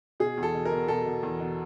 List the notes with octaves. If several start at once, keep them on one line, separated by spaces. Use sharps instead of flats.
B2 G#4
E2
A4
B2
A#4
B2
B2 A4
B2
E2
B2